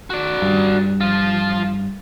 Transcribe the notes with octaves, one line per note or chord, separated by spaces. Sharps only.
F#4 D5
G2
F3 F4